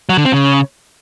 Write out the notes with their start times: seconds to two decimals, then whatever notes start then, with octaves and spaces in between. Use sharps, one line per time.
0.09 F#3
0.17 D3
0.25 C4
0.33 C#3